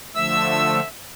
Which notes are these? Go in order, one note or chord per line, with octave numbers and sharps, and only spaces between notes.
D3 F3 A3 E5 E6